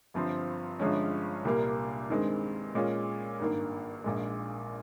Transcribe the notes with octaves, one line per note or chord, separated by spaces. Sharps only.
G1 G2 F3 C4
G1 G2 F3 G#3 C#4
C2 A#2 G3 A#3
G2 D#3 G#3 C4
A#2 G#3 C#4 F4
G#1 G2 D#3 A#3
A#1 A#2 G#3